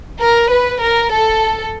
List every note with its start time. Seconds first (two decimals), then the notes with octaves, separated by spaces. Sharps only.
0.19 A#4
0.50 B4
0.82 A#4
1.13 A4